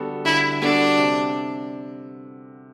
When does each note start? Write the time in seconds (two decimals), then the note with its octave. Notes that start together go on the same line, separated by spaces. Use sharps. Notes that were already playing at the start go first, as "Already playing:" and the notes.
Already playing: D3 G3 B3 F#4 A4
0.25 D3 E4
0.61 G3 B3 D4 F#4 A4
0.98 C3